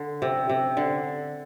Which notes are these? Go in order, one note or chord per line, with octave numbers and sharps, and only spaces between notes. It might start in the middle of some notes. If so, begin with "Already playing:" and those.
Already playing: D3
C3
C3
D3